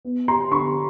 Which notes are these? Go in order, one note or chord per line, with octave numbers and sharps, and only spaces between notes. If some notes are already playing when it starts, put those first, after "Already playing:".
B3
A#5 C6
D3 B5 C#6